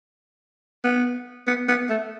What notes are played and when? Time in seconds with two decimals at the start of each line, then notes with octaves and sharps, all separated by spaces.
0.84 B3
1.47 B3
1.68 B3
1.89 A3